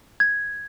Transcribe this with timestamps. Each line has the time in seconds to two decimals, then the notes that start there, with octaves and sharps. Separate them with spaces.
0.20 G#6